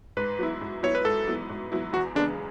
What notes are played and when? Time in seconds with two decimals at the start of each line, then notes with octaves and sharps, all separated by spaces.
0.17 G#2 B4
0.39 F#3 B3 E4
0.61 G#2
0.83 F#3 B3 E4 C#5
0.95 B4
1.05 G#2 A4
1.27 F#3 B3 E4
1.49 G#2
1.72 F#3 B3 E4
1.93 E2 F#4
2.15 C#3 G#3 B3 D4